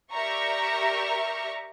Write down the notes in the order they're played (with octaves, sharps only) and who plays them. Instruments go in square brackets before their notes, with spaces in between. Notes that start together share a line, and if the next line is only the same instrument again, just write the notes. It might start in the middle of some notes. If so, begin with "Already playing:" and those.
[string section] G4 A#4 D5 E5 A#5 C#6